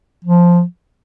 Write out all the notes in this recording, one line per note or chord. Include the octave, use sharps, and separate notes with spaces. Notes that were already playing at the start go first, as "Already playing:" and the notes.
F3